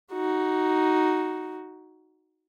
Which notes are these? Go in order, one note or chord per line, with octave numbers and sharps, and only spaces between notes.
D#4 F#4